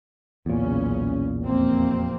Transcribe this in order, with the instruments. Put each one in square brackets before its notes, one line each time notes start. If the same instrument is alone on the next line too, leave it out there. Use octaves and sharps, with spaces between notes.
[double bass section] B1 C#3 C#4 [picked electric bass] E2 A#2
[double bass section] F1 A#3 C4